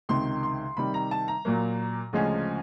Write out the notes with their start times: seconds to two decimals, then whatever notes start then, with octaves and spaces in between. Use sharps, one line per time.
0.09 C#2 C3 D#3 C6
0.43 C6
0.77 C3 D#3 G3 B5
0.94 A#5
1.11 A5
1.28 A#5
1.45 A#2 F#3 A#3
2.13 D2 C#3 F3 G#3 C#4